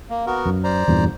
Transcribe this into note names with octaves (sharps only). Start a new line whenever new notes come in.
A#3
B3 F#4 A#4
F#2
C5 D5 A#5
E2 G2 A#2